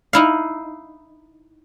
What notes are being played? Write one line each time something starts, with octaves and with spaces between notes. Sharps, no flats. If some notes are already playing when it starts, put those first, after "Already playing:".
D#4 E4 F5